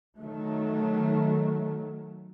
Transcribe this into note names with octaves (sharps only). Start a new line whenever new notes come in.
D#3 F#3 A3